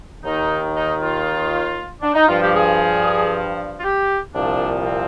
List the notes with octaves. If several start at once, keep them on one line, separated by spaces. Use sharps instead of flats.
D#2 D#3 D#4
D#4
F4
D4
D#4
G2 F3 F4
G4
G#4
F4
G4
C2 A#2 F3 D4
C4